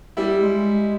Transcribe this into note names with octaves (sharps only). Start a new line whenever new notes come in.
G3 E4
G#3